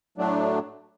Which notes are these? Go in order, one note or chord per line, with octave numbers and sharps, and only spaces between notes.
A2 F#3 A3 D4